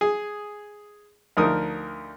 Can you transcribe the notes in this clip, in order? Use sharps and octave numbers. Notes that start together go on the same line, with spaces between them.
G#4
D2 F3 D#4 A#4 D#6